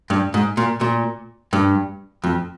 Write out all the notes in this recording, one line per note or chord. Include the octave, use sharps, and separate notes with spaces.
G2
G#2
A#2
A#2
G2
F2